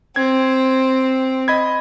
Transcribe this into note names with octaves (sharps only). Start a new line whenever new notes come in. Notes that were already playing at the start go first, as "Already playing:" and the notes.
C4 G#6
D#5 B5 G#6